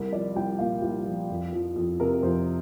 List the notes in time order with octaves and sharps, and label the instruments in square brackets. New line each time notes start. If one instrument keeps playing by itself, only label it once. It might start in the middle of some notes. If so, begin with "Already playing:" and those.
Already playing: [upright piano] C2 A#4
F3 D5
C2 G5
A#2 F5
C2
F3
F2
F3
F2
C3 A#4
F2 C5